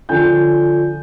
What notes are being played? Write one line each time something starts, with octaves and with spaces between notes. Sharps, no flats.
D3 F3 G#5 G6